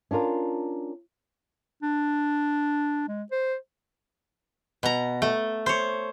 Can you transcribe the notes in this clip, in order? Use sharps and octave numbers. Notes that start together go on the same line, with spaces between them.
C#4 D4 F4 A#4
D4
G#3
C5
B2 A#5
A3
C5 C#5